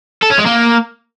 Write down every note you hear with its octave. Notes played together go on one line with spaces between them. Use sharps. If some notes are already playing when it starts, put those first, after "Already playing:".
A4
C#4
G#3
A#3